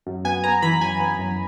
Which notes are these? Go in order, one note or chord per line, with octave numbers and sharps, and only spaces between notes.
F#2
B3 G#5
B3 A#5
E3 B5
F#2 G#5
B3
F#2